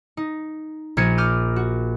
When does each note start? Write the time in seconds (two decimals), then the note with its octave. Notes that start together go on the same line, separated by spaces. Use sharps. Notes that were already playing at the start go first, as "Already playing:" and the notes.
0.17 D#4
0.97 A#1 A#4 G#6 C#7 D#7
1.18 D6 F6 G6 D#7
1.56 F#4